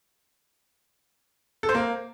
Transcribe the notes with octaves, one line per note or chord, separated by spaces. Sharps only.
A4
C5
A#3